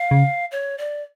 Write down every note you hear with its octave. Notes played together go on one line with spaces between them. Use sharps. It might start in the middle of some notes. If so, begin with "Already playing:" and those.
Already playing: F5
C#3
C#5
D5